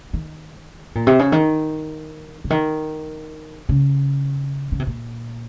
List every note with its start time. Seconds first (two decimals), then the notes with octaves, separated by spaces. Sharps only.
0.13 D#3
0.95 A#2
1.07 C3
1.19 C#3
1.32 D#3
2.44 C#3
2.50 D#3
3.69 C#3
4.72 C#3
4.80 C3
4.87 A#2